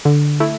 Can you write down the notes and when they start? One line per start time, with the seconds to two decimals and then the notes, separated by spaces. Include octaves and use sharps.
0.05 D3
0.40 A3 E4